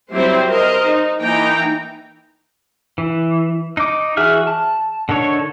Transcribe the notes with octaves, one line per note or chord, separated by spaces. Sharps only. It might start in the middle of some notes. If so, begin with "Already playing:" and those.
F#3 G3 C4 E4 C5
A#4 C5 D#5
D#4
E3 A#3 D#4 G5 A#5
E3
D#4 D6
E3 F#4 G#4 E5 F6
A5
D3 D#3 A4 C#5